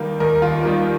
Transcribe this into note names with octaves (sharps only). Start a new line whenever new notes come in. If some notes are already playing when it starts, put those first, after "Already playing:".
Already playing: D#2 D#3 G3 A#3 A#4
D#2 A#4
F4
D#3 G3 A#3